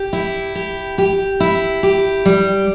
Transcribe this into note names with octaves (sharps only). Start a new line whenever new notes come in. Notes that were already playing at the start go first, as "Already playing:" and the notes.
Already playing: G4
E4
G4
G4
E4
G4
G3